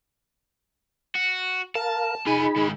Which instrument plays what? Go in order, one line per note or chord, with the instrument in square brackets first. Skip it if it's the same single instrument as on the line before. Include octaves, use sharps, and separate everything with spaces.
[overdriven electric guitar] F#4
[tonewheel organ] A#4 F5 [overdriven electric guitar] A5
[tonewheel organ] D#4 G#4 B5 [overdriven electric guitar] F4 G#5
[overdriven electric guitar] D#3 G#3